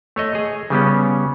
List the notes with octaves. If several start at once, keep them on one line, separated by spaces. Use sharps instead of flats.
A3 C#5 D#5
G#4
C#3 G3 B3 C#4